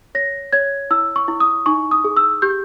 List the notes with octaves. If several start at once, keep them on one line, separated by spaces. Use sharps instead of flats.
C#5 A#6
C#5 G#6
E4 E6
C#6
E4
D#6
D#4 C#6
D#6
G#4
E6
G4 G6